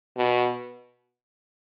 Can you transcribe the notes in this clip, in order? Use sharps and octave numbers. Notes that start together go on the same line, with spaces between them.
B2